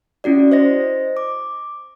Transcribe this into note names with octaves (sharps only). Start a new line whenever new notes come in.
C#4 E4 F#4 D5
C5 D#5 A#6
D6